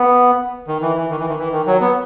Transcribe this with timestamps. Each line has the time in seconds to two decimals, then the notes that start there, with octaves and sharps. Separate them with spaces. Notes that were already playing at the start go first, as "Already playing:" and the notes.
Already playing: B3
0.68 D#3
0.82 E3
0.96 E3
1.10 D#3
1.19 E3
1.29 D#3
1.39 E3
1.52 D#3
1.67 F#3
1.81 B3